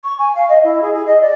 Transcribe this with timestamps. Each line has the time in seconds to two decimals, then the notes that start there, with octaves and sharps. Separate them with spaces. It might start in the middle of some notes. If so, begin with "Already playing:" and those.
0.04 C#6
0.19 G#5
0.35 F5
0.49 D#5
0.64 E4
0.82 G#4
0.94 G#4
1.06 D#5
1.21 D5